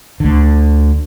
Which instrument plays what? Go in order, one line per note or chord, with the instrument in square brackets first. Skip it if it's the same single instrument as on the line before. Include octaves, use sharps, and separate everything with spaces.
[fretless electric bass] D2 D3